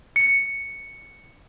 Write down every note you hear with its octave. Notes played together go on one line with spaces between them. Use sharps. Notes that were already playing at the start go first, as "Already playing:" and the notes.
C#7